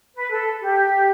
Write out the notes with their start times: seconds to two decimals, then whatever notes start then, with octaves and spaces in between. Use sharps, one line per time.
0.15 B4
0.31 A4
0.60 G4